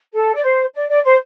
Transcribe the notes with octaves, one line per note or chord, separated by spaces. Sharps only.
A4
D5
C5
D5
D5
C5